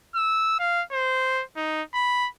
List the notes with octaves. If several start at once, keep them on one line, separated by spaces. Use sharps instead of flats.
E6
F5
C5
D#4
B5